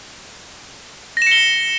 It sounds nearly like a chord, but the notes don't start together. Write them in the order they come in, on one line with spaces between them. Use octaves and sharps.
A#6 E7 C#7 G7